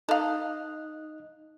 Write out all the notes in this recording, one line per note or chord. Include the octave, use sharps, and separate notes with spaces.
D#4 A4 D#5 F5 F#6